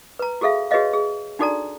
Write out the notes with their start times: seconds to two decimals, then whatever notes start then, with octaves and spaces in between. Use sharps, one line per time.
0.19 B4 A#5
0.41 F#4 G#4 A4 E5 F5
0.71 F#4 G#4 B4 C#5 D#5 F5
0.93 G#4
1.39 D4 D#4 F#4 A4 D5 A#5